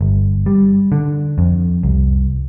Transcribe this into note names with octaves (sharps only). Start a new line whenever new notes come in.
G1
G3
D3
F2
C2